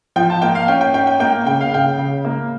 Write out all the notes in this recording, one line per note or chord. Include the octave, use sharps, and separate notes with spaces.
F3 G5
A5
A#3 G5
F5
C#4 G5
G5
C#4 G5
G5
A#3 G5
C#3 G5
F5
C#3 G5
C#3
A#3